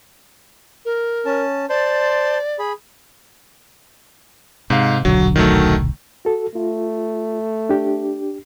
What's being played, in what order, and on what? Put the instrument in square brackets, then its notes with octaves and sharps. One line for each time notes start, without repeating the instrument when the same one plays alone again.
[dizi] A#4
[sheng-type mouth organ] C#4 A5
[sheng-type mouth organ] C5 A5 C6 [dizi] D5
[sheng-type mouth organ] G#4 B5
[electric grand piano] G#2 F5 [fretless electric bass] C3
[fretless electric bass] D#1 B1 D3 [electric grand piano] F#3
[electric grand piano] D#3 F#3 A3
[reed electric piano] F#4 A4
[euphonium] A3 [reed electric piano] F4
[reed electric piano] D4 G4